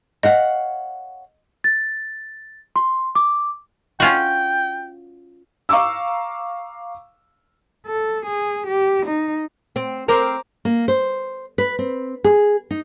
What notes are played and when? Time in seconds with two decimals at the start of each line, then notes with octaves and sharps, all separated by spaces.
0.23 C#5 D#5 F5 F#5
1.64 A6
2.76 C6
3.15 D6
4.00 C#4 F4 F#4 G5
5.69 F5 A#5 C#6 D6 E6
7.87 A4
8.26 G#4
8.68 G4
9.07 D#4
9.76 C4
10.08 C4 A#4 C5 A#5 D6
10.65 A#3
10.88 C5
11.58 B4
11.79 C4
12.24 G#4
12.71 D#4